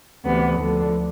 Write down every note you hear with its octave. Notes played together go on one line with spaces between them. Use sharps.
D2 C3 E3 B3
D2 D3 F3